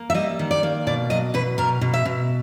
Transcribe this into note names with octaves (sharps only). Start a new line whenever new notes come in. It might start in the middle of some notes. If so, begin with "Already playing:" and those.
Already playing: A#3
E5
G3 D#5
D#3
D5
A#3
B2 D5
F#3 D#5
B2 B4
B2 A#4
B2
E5
B2